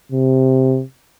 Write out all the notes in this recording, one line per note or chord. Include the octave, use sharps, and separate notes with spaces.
C3